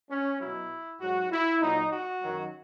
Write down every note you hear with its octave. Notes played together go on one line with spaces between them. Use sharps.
C#4
B2 F#3 E4
G#2 F#3 F#4
E4
A#2 F#3 D#4
F#4
F#2 D#3 F#3